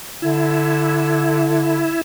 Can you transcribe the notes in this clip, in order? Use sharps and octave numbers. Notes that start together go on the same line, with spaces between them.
D3 E4